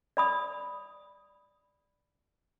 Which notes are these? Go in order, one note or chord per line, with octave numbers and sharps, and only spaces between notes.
D5 B5 D#6